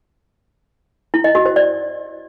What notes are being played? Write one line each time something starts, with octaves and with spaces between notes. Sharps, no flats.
E4
D#5
F#4
C5
D5